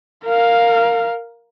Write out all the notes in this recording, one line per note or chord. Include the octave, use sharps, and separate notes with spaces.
A#4 F5